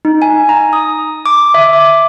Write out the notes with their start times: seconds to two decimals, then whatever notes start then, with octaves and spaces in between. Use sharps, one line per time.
0.05 D#4
0.22 G#5
0.49 A#5
0.73 D#6
1.26 D6
1.54 E5
1.73 D6